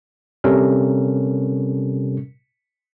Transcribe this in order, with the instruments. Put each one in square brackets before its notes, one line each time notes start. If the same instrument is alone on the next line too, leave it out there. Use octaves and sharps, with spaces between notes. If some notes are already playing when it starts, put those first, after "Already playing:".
[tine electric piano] C3 G3 C#4 A4 A#4